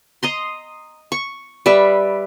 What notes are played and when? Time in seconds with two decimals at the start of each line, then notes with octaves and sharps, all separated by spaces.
0.23 D#5 A#5 C6
1.12 C#6
1.66 G3 B4 E5